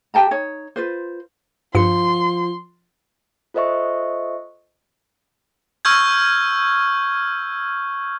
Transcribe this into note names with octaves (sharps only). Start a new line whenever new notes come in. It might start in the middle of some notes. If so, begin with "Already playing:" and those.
G4 G5 A5 A#5
D#4 C#5
F4 B4 C5
G2 F3 C6 C#7
F4 A4 C5 D#5 E5 C#6
C#6 E6 F6 G6 G#6